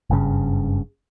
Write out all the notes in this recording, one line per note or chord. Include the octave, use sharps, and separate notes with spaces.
F#1 G2 C#3